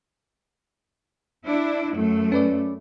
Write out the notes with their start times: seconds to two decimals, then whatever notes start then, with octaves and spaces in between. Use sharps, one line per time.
1.46 D4 E4
1.96 F#2 A3
2.32 C#4 B4 D5